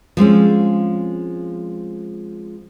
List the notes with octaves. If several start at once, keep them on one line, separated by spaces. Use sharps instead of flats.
F3 G#3 C4 C#4